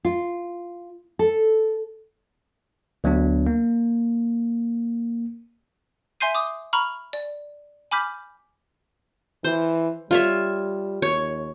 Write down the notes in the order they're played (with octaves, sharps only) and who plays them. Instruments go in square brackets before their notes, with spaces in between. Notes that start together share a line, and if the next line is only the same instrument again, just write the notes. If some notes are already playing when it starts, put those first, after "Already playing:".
[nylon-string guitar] F4
A4
[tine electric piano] D2 F#3 B3 D4
A#3
[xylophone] E5 G#5 C6 G6 C7 D#7
D6 D#6
A#5 B5 C#6 F6
D5
G#5 B5 D6 F6 G6 B6
[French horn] E3 [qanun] C5
[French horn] G3 [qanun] F4 C#5 E5
[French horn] D#2 [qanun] C#5